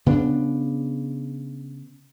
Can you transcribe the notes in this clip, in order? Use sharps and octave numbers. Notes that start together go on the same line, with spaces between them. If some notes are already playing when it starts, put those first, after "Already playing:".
C#3 B3 D4